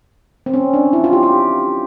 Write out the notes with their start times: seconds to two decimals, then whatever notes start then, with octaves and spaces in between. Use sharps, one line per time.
0.46 C4
0.54 C#4
0.73 D4
0.93 E4
1.04 F4
1.13 G4
1.23 G4